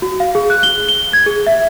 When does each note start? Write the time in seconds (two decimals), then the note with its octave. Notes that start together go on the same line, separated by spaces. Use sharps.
0.02 F#4
0.20 F5
0.35 G#4
0.50 F#6
0.63 G7
0.89 G7
1.13 G#6
1.26 G#4
1.47 E5